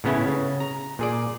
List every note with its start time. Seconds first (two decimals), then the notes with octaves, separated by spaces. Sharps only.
0.04 A2 C#3 B3 C#4 E4
0.28 C#3
0.60 A#5
0.99 A#2 G#4 D5